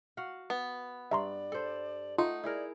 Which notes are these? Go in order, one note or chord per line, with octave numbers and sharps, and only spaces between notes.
F#4 F5 F#5
B3
G2 D5 E5 A#5 C6
A4 C5
A3 D#4 F4 F#5
E4 G#4 A#4 D5